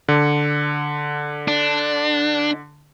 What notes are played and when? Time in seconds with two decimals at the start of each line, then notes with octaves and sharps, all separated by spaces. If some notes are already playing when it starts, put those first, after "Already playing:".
0.08 D3
1.48 D4